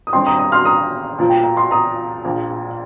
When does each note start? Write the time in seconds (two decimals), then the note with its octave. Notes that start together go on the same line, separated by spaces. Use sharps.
0.07 D#6
0.13 G1 G2 D#3 G3 C4 G5 C6
0.27 A#5 D#6
0.39 A#5 D#6
0.52 C6 F6
0.65 A#5 D#6
1.18 A#2 F3 A#3 F4 A#4
1.30 G5
1.43 A#5
1.57 C6
1.71 A#5 D#6
2.24 A#1 A#2 F3